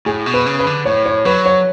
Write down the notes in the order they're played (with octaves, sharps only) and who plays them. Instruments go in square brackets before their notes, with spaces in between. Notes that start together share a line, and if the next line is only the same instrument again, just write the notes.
[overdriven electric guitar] A2 [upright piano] G#4
[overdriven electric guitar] B2
[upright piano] B4
[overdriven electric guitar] C#3
[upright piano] B4
[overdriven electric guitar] D3
[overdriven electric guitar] A2 [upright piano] C#5
[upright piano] C#5
[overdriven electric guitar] F#3 [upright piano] B4
[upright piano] C#5